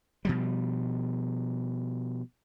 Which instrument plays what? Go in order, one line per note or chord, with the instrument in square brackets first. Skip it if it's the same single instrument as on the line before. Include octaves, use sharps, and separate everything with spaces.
[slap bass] B2 F3 G3